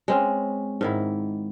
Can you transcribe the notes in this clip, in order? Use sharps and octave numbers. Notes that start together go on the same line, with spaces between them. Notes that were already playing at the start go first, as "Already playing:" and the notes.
G#3 C4 C#4
G#2 D#3 E4